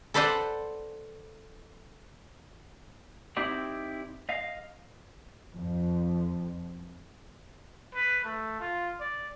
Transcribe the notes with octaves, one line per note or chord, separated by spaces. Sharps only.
A4 B4 C5 D5 F#5
C4 D#4 E4 G4 D5
D#5 F5
F2
B4
A3
F4
D5